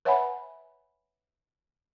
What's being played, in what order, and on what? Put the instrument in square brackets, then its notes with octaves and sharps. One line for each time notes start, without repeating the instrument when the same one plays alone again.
[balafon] B4 C#5 E5 F#5 G#5 B5